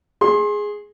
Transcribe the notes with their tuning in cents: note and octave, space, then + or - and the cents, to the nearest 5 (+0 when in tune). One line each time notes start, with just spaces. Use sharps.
G#4 +0 C6 +30